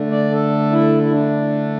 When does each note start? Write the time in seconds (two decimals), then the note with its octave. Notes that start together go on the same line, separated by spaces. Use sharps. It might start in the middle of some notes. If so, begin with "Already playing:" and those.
Already playing: D3 A3
0.11 D5
0.32 A4
0.72 E4
1.03 E4
1.12 D4